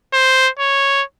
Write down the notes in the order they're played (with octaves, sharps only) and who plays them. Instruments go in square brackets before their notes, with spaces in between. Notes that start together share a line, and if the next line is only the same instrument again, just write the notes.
[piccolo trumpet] C5
C#5